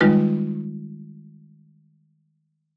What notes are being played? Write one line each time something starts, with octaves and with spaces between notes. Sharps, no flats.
D#3 G3 G#3 D#4 F4 B4